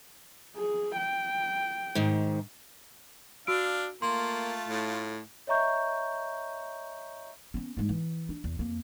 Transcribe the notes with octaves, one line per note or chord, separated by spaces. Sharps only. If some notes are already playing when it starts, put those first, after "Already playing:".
G#4
G5
G#2 D#3
D4 F#4 F5 E6 D7
A3 A#3 F4 C6
A2
C#5 D#5 E5 A#5 C#6 G6
B3 C#4
G#2 G#3
E3
D4
E2
F2 A#3